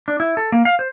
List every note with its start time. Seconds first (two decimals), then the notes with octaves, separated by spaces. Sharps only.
0.08 D4
0.20 E4
0.37 A4
0.52 A#3
0.65 F5
0.79 C5